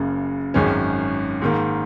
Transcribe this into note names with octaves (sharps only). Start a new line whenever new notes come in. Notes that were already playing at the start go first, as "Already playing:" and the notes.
Already playing: F#1 F#2 C#3
G#1 F#2 D#3 G#3 C#4
G#2 D#3 A#3